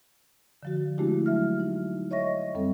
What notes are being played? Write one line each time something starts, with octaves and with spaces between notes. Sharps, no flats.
D3 F3 F#4
G#3 A3 D4 E4 F#4 G4
F#3 E5 F6
D#4
C#5 D#5 E5 C#6 A#6
F#2 G3 C4 A4